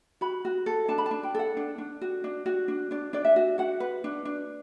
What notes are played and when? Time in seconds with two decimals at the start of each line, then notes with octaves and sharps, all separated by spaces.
0.21 F#4 B5
0.45 F#4
0.66 A4
0.88 D4 A5
0.98 B5
1.06 A5
1.11 D4
1.23 G5
1.35 A4 F#5
1.57 D4
1.78 D4
2.01 F#4
2.24 D4
2.46 F#4
2.68 D4
2.91 D4 D5
3.13 D4 D5
3.25 E5
3.36 F#4
3.58 F#4 F#5
3.80 B4
4.04 D4
4.25 D4